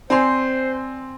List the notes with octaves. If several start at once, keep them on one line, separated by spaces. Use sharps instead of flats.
C4 C5 D5 G#5 C6